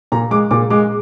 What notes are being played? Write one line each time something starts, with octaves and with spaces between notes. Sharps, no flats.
A#2 A#5
G#3 D6
A#2 D6
G#3 D6